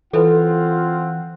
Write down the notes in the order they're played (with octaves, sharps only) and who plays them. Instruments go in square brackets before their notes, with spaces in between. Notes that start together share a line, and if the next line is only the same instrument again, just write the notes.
[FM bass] E3 [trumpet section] C4 F#5 [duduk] F4 [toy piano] A4 B4